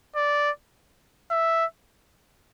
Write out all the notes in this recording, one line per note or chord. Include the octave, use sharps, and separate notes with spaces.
D5
E5